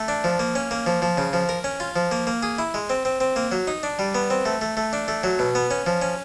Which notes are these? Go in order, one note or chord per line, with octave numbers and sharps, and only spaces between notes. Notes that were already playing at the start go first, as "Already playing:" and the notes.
Already playing: A3
D4
F3
A#3
C#4
A#3
F3
F3
C#3
F3
A#4
C#4
F4
F3
A#3
A#3
G#4
E4
G#3
C4
C4
C4
A#3
F#3
D#4
D4
G3
B3
C4
A3
A3
A3
D4
A3
F#3
B2
B3
C#4
F3
C#4